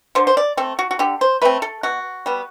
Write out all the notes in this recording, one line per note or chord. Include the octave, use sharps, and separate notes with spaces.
D3 C5
C5
D5
A3 C4 A4
F#4
F#4
D3 G4
C5
A3 C4 B4
A4
B2 F#4
G3 B3